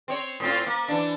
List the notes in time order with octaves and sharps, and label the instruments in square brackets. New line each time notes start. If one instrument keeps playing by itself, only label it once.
[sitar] C4 C#5
A2 C4 F4
A#3
E3 D4